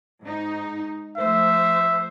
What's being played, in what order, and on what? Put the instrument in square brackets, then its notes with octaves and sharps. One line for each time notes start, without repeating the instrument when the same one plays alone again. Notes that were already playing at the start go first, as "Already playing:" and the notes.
[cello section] G#2 D#4
[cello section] F3 A3 C5 [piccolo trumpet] E5